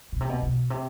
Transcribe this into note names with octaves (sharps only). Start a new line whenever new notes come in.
B2
C3
B2
B2
C3